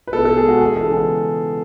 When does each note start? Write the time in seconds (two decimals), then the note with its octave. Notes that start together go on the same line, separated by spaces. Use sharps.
0.07 B4
0.13 B2 A4
0.25 A4
0.37 G#3 B3 G#4
0.48 F#4
0.61 E2 G#4
0.77 A4
0.85 C#3 E3 G#3 B3
0.93 G#4